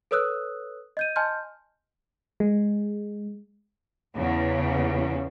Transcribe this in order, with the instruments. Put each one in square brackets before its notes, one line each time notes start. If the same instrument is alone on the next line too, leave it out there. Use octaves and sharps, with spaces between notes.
[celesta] A4 B4 C#5 D#6 E6 F#6
D#5 G6 D#7
D#5 G#5 A5 C6 F6 G6
[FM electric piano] G#3
[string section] E2 C#3